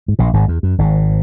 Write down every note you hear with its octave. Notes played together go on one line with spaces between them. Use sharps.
G#2
A#1 A#2
G#1 G#2
E2
F#2
G#1 G#2